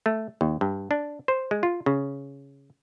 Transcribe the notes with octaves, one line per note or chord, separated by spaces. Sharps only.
A3
D#2
G2
D4
C5
G#3
F4
C#3